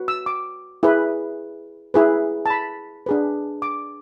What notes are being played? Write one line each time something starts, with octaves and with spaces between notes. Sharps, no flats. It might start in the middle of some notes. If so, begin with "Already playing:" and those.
Already playing: F#4 B4
E6
D6
E4 G#4 B4
E4 G#4 B4
A5
B5
D4 G#4 B4
D6